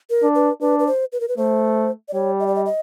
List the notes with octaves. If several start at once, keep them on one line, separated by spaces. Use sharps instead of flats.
A#4
D4
B4
D4 B4
B4
C5
B4
A#4
B4
A3 C5
D5
G3 C#5
D#5
D5
D#5
D#5